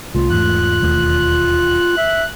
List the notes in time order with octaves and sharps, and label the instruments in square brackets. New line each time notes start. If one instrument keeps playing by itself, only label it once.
[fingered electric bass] C2 A3 [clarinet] F4
[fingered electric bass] E2 G#2 A3 [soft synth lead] F#6
[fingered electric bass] E1 D#2 A3
[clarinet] E5